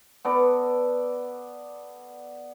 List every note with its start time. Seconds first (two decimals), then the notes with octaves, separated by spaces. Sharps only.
0.25 B3 A4 D5 A#5